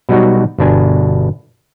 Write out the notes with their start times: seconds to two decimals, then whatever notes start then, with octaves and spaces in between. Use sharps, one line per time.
0.09 B2 F#3 G3 D#4 F#4
0.58 G1 B2 D4 G#5